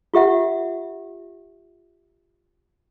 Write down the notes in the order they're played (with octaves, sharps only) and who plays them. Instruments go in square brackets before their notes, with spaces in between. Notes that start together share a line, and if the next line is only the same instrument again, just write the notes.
[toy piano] F4 G4 E5 F#5